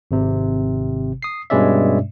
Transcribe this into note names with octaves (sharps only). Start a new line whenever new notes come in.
G#1 C3
D#6 C7
G2 B2 G#3 C#4 D5 E5